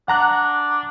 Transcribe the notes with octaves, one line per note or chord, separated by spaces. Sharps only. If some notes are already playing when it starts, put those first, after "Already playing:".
D4 F#5 A#5 F#6